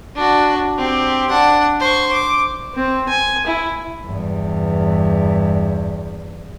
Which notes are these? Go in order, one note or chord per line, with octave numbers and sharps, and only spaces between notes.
D4 F#4
C4 G4
D4 F#5
C5 C#6
D6
C4
G#5
E4
E2 G2